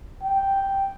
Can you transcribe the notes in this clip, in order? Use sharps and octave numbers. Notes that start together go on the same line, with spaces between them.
G5